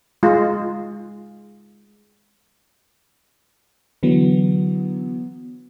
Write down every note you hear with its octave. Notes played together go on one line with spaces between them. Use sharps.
G#3 F4
D3 E3 F#3 B3